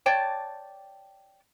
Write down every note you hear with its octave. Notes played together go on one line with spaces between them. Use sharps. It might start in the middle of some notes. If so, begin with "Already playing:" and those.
C#5 D5 G5 A5